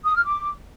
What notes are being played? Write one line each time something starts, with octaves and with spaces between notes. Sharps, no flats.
D#6
F6
D6